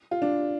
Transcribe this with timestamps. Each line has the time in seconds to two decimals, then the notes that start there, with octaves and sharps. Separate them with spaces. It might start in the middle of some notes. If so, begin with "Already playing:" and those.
0.11 F4
0.22 D4